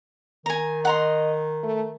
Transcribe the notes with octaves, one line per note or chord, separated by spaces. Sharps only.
D#3 G#5 A#5
D#5 F#5 A#5 C6
A3